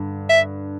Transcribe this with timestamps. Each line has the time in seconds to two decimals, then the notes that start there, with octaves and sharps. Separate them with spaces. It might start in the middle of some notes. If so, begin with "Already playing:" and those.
Already playing: G2 D3
0.29 E5